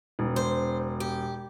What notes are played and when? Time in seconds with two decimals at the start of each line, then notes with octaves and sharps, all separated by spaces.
0.19 E1
0.36 C5
1.00 G4